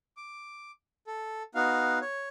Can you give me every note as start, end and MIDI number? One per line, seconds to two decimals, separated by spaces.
0.17 0.71 86
1.07 1.43 69
1.55 1.99 59
1.55 1.99 63
1.55 1.99 66
1.55 1.99 77
2.02 2.29 73